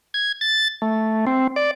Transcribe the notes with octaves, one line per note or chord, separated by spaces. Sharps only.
G#6
A6
A3
C4
D5